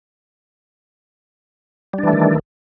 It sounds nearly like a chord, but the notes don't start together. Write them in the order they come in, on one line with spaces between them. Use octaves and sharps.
G3 D4 E3 A3 D#3